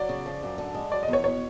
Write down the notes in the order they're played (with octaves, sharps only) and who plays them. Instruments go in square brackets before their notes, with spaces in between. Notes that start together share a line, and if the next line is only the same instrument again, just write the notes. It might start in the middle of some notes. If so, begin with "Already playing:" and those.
Already playing: [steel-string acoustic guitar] F#3 [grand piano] D5
[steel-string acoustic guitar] C#3
F3
F#2
D3
G#3
[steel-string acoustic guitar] F#3 [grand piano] D5
[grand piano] D#5
[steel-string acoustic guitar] E2 [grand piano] C#5
[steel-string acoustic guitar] B2 [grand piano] C#5